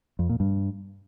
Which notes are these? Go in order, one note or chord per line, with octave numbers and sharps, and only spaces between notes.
F2
A#2
G2